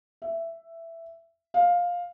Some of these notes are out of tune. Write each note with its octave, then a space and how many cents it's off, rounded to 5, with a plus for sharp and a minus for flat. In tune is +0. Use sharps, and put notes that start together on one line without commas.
E5 +10
F5 +10